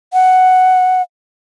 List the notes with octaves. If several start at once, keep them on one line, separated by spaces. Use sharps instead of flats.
F#5